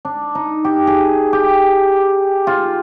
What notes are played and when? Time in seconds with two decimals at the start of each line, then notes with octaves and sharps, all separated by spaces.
0.05 D4
0.35 D#4
0.64 G4
0.87 G#4
1.33 G4
2.47 F4